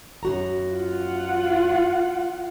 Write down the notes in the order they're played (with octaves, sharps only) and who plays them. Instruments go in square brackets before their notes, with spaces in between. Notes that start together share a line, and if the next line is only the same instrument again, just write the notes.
[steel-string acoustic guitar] F#2 F#4 A#5
[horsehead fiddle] F4 F#5